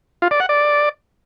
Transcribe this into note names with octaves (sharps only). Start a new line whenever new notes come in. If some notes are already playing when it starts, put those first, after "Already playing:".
F4
D5
F#5
D5